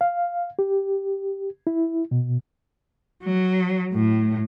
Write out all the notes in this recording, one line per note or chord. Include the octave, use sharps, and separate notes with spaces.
F5
G4
E4
B2
F#3
A2